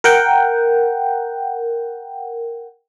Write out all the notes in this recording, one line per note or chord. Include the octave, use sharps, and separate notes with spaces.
A#4 F#5 G5